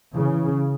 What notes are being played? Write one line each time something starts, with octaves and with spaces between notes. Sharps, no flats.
C#3 E3